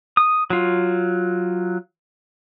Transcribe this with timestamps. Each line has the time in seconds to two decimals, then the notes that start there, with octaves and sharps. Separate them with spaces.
0.17 D#6
0.50 F#3 F4